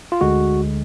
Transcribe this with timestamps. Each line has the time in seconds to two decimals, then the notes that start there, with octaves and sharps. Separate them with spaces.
0.12 F4
0.21 D2 D3 G#3 F#4